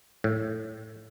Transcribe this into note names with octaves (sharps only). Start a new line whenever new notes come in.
A2